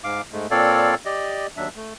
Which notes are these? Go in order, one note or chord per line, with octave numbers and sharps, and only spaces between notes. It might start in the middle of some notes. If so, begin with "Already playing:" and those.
G#2 F5 D6
G#2 G#3 A3
A#2 C4 A4 C#5 D5 F5
G4 D5 D#5
D#2 F#3 D4 E5
A3